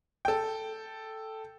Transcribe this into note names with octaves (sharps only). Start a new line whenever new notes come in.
A4 G5